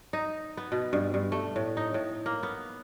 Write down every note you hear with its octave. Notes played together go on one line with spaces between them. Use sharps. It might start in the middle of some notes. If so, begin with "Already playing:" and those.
D#4
B3
B2
G2
G2
A3
A2
D#4
A2
A#3
B3